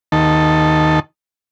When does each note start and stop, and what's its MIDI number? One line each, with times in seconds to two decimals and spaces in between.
0.12 0.99 39
0.12 0.99 51
0.12 0.99 81